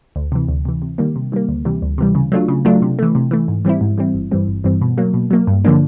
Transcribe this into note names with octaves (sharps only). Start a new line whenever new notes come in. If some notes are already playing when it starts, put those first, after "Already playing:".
D2
C3 E3
D2
C3 E3
C3
D#3 G3 A#3
C3
D#3 G3 A#3
D2
C3 E3 G3
D2
C3 E3 G3
C#3
F#3 A3 D4 F4
C#3
F#3 A3 D4 F4
C3
E3 A3
C3
E3 A3
G#2
E3 G3 C4 E4
G#2
E3 G3 C4 E4
G1
G2 E3 G3 C4
G1
G2 E3 G3 C4
B2
F#3 A#3
B2
F#3 A#3
G2
D3 F3 A#3 D4